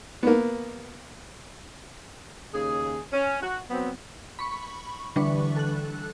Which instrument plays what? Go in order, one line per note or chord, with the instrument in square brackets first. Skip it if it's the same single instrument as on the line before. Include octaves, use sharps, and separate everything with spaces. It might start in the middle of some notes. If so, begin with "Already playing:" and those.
[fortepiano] A#3 B3
[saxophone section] D#2 C#3 G#4
C#4
F#4
F#3 B3 C4
[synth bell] B5 C#6
D3 E3 G3 D4 B4 C#6
A4 F#6